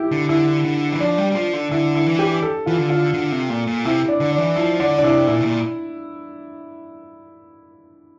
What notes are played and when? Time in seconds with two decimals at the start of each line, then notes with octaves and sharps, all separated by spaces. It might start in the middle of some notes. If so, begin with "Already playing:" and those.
Already playing: E4 G4
0.12 D3
0.29 D3 E4
0.65 D3
0.92 E3
1.00 F3 D4
1.18 G3
1.32 G3
1.35 F3
1.53 D3
1.71 D3 E4
1.95 E4
2.06 E3
2.19 G4
2.43 A4
2.66 E3 F4
2.78 D3
2.90 F4
3.14 D3
3.32 C3
3.50 A#2
3.67 A#2
3.85 C3 E4
4.08 D4
4.20 D3
4.32 D4
4.38 E3
4.56 F3 E4
4.80 D3 D4
4.99 D4
5.03 C3 E4
5.27 A#2 E4
5.41 C3
5.45 A#2